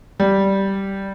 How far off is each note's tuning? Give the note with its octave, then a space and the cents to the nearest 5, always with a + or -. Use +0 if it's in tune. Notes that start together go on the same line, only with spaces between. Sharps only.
G3 -5